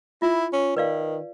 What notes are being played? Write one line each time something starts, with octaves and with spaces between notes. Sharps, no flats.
E4 F4
C#4
D#3 B4 D5 F5